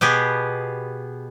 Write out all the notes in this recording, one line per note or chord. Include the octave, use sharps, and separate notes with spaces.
B2 B3 G4 G#4